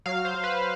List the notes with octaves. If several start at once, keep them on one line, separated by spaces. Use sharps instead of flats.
F#3 F5
C5
F#3
B4